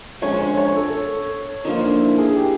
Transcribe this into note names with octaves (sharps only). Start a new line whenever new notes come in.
D3 F3 G#3 C#4 C#5
C#5
C#5
A4
A4
D3 F3 A#3 D#4
D4
E4
G#4
G4